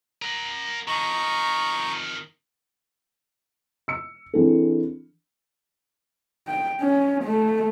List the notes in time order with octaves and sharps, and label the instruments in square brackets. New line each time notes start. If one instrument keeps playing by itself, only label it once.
[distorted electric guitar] A#4 F#5
[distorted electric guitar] F2 D#3 [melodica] A#5 C#6
[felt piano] E6 C#7
E3 C4 D4 G#4 A4
[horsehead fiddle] G5
C#4
A3